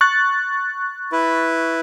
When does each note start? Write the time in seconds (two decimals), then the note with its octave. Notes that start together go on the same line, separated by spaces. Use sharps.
0.01 C#6 F#6 A6
1.12 E4 B4